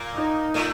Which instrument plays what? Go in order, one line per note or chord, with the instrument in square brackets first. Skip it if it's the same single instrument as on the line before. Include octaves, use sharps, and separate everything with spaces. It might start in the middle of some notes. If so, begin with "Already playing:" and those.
Already playing: [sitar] A#2 A#3
[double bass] D#4
[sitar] A2 A3